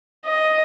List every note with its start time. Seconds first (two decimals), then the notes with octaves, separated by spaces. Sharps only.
0.26 D#5